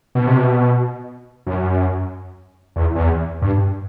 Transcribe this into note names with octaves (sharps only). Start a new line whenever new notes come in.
B2
C3
B2
F#2
E2
E2
G2